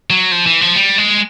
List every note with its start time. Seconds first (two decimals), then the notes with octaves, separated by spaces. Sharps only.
0.10 F#3
0.32 F3
0.46 E3
0.61 F3
0.75 G3
0.98 G#3